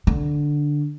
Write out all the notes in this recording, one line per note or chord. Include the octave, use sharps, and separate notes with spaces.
D3